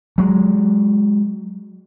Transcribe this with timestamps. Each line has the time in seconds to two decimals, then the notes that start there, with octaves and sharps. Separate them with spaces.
0.18 F#3 G#3